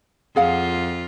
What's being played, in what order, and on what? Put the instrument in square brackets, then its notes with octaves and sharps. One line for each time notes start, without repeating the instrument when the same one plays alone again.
[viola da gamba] F2 F4 [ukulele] G#4 F5 F#5